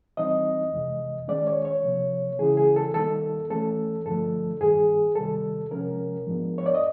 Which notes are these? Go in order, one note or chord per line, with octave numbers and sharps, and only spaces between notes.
E3 G3 C4 D#4 D#5
F2 C3 E3 G#3
D#3 G#3 C#4 D5
C#5
C#5
C3 F3 A#3
C#3 E3 G#3 C#4 E4 G#4
G#4
A4
D#3 G3 A#3 D#4 A4
E3 A3 C#4 A4
G2 D3 F3 A3 A4
G2 D#3 G3 G#4
C3 D#3 G3 A4
C3 F3 G#3 C#4 A#4
G#2 F3 G#3 B3 D4
C#5
D5
D#5